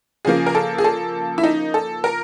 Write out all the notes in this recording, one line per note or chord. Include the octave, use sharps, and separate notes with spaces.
C#3 F3 A#3 G#4
A#4
A4
G#4
A4
E4
D#4
A4
A#4